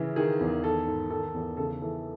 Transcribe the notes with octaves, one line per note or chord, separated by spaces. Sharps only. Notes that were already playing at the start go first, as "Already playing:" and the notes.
Already playing: C#3 E3
D#3 G#4
E2
D#3 A4
G#2
D#3 A4
E2
C#3 A4
E3 A4